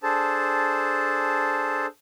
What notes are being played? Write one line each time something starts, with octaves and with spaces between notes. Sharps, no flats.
D4 G#4 A4 C5 A5